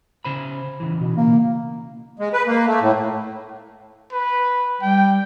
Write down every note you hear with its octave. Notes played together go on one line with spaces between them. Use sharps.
C#3 C5 B5
C#3 E3
B2
A#3
G#3
B4
A#3
A3
A2
B4
G3 G5